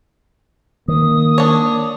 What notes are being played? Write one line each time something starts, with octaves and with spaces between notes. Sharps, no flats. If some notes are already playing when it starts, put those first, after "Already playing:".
D#3 A#3 D#6
D4 C#5